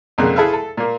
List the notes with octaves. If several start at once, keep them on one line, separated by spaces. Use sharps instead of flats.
B1 F2 A#2 C#3 A#3 F#6
E4 G#4 A4 B4 E5 F5
A4
A#2 A#3